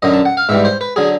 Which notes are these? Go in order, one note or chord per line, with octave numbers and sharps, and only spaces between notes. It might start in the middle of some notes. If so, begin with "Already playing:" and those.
F#2 D3 F#3 D#5
A5
F#5
F5
G#2 E3 G3 E5
C5
B4
D3 F#3 G#4